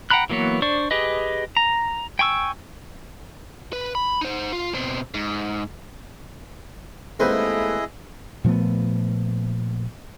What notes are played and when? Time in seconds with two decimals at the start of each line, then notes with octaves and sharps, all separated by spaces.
0.10 F#5 G5 A#5 B5 F#6
0.30 E3 F#3 A#3 B3 C#5
0.62 D4 C5 D5 C#6
0.91 G4 G#4 B4 D#5
1.57 A#5
2.19 G5 G#5 C#6 E6
3.73 B4
3.95 B5
4.21 D#4 C5
4.53 F4
4.74 B2 C4
5.14 G#2
7.20 D#2 G#3 A3 C4 E4 G#4 B4 D#5
8.44 A#2 F3 A3 B3